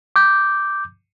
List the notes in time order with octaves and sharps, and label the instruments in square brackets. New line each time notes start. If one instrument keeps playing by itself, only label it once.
[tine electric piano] D6 G6